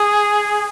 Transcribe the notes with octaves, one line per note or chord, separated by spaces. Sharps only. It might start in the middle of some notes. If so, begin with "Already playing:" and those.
Already playing: G#4